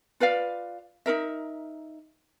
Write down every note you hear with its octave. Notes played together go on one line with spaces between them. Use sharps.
F4 B4 D5 F5
D#4 F4 A#4 E5